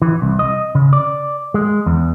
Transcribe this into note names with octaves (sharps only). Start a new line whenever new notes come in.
E3
C2
D#5
C#3
D5
G#3
E2